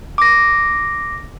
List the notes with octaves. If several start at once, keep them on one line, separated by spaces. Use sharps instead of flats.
D6 A#6